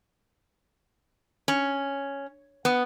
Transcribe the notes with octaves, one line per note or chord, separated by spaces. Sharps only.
C#4
B3